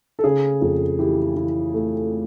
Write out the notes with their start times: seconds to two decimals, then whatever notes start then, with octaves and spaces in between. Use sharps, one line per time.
0.19 A4
0.24 C#3 G#4
0.62 F2 G#4
0.99 E3 G4
1.37 E3
1.74 A3